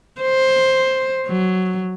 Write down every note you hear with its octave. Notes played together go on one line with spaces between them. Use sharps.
C5
F#3